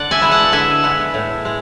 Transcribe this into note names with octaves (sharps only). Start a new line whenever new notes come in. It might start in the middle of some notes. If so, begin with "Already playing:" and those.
Already playing: D3 D5 F#5
E5 G#5
G#3 B3 E4
F#5 A5
D3 E5 G#5
G#3 B3 E4
A2
G#3